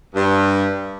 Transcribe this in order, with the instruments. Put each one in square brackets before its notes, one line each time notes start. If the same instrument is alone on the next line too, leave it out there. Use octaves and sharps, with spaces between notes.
[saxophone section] G2